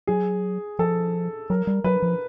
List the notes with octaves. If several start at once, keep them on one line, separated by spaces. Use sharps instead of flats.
F#3 G#4
F3 A4
F#3 A#4
G3
F#3 B4
F3